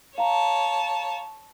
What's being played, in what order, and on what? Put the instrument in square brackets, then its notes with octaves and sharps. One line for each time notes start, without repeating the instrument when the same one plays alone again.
[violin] C#5 A5 [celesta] F5 A#5